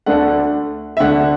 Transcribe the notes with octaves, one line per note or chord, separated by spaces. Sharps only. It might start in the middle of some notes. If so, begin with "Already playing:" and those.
D2 D3 A3 D4 F#5
E5
D2 D3 A3 D4 F#5